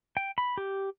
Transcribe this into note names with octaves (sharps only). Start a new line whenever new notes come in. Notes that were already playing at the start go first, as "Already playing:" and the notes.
G5
B5
G4